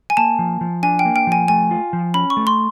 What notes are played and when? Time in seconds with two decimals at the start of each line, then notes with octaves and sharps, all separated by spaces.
0.10 G#5
0.17 A#3 A5
0.39 F3
0.61 F3
0.83 D4 G#5
0.99 G5
1.05 A#3
1.16 G5
1.27 F3 G#5
1.48 A3 G#5
1.71 F4
1.93 F3
2.14 C#4 B5
2.30 C#6
2.37 A3
2.47 C6